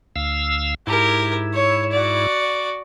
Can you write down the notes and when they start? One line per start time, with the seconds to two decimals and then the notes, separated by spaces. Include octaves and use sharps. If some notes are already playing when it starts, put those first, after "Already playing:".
0.16 D2 F5 E6
0.87 G#2 E4 G4 A#4
1.54 C#5
1.92 F#4 D5